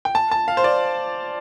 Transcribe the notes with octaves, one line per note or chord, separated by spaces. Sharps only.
G5
A5
A5
F5
C5
D5